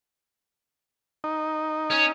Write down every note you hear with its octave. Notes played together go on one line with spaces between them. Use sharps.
D#4
C#4